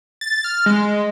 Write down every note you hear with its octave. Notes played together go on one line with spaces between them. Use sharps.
A6
F6
G#3